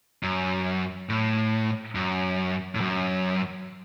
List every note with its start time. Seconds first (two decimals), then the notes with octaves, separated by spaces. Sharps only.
0.23 F#2
1.09 A2
1.95 F#2
2.75 A2
2.81 F#2